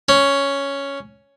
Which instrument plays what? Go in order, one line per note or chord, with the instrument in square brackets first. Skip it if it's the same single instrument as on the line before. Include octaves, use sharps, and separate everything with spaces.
[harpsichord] C#4